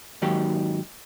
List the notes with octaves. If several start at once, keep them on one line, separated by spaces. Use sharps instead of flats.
G#2 D#3 F#3 A#3 D#4 G4